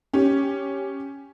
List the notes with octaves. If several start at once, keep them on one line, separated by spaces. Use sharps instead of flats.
C#4 G4